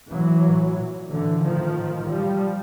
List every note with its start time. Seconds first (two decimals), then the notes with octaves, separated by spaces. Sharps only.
0.10 A2 E3 F#3
0.44 A2
0.77 A#2
1.10 A#2 D3 E3
1.43 A2 D#3 F3
1.76 A2
2.09 A#2 F3 G3